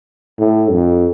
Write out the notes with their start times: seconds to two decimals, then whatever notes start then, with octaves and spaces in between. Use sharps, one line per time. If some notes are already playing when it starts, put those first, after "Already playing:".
0.39 A2
0.72 F2